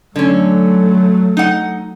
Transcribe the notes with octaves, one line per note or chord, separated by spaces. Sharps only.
D3 F#3 A3 C#4
D#4 F#5